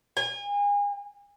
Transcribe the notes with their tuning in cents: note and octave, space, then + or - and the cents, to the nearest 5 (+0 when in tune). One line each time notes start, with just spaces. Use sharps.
G#5 -35